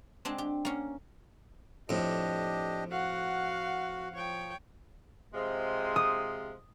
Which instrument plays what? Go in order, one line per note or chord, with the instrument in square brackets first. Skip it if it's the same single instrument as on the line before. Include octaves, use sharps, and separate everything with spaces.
[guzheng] G#3 C4 D4
G4
A#3 C#4
[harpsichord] F2 A2 [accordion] D4 G4 D#5
[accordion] F#4 [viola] F5 F#5
[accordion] F3 [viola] C#5 G5
[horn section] C3 F3 G#3
[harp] D#6